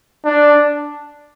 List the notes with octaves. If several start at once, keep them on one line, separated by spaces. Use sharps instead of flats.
D4